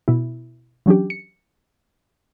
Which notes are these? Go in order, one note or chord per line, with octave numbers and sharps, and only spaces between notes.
B2 E4
E3 F#3 C#4 D4 G4
C#7